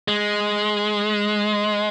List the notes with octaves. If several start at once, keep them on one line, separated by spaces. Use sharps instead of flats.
G#3